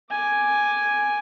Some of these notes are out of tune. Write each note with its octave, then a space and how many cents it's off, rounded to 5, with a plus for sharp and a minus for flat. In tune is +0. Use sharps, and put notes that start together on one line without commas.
G#5 +0 D6 +5